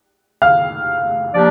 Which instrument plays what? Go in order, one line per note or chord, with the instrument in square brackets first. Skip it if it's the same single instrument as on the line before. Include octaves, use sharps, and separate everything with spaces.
[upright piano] F5 F6
[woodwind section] F3 A#3 D4 G4 D5